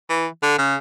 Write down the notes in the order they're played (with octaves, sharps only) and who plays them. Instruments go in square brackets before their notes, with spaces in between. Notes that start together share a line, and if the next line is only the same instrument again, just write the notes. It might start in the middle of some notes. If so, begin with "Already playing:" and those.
[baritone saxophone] E3
D3
C#3